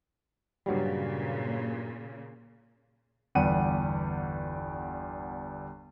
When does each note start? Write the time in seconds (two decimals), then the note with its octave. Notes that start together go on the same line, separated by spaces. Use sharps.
0.66 G2 A#2 C#3 F#3 G3
3.35 G1 E2 G3 G4 F#5 D#7